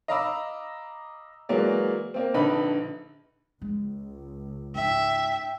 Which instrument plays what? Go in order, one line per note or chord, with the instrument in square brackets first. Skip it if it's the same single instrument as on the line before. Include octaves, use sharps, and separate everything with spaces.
[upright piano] D#5 F5 A#5 B5 D6 E6
E3 F#3 G#3 A#3 D5
A#3 C4
A#1 D3 D#4 B4 B5
[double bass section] C#2 [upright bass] G#3
[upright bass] G#2 [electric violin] E5 [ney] G5